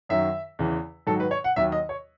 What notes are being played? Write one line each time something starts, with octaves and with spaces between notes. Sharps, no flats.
F#2 D#3 F#3 E5
E2 C#3 E3
G#2 D#3 F#3 A4
B4
C#5
F#5
D#2 D#3 F#3 E5
D#5
C#5